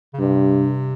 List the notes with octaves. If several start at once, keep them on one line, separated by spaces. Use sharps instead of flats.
C#3
G2 C3